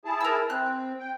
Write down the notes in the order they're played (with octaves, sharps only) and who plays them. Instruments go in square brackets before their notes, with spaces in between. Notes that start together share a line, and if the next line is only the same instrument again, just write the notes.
[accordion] E4 G#4 A5
[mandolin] A#4 E6
[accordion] C4 [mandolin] F#6
[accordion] G5